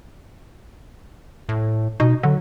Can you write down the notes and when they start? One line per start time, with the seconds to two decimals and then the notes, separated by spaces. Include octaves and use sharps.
1.49 A2
2.00 B2 D#4
2.23 D3 F#3